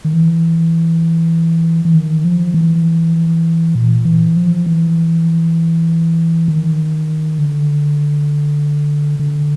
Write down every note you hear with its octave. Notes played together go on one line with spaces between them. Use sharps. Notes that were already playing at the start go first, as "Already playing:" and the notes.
D#3
E3
E3
D#3
F3
E3
A#2
E3
F3
E3
D#3
D3
D3